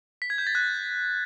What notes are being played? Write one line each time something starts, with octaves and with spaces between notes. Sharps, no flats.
B6
G#6
G6
A6
F#6